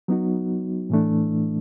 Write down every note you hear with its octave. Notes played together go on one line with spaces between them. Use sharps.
F#3 B3 D#4 F#4
A2 E3 A3 D4